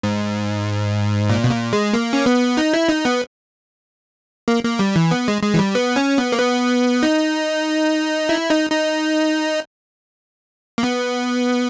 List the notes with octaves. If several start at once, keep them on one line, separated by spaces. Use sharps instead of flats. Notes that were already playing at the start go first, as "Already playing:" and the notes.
G#2
A#2
B2
A#2
G#3
A#3
C#4
B3
D#4
E4
D#4
B3
A#3
A#3
G3
E3
B3
G#3
G#3
E3
G3
B3
C#4
B3
A#3
B3
D#4
E4
D#4
D#4
A#3
B3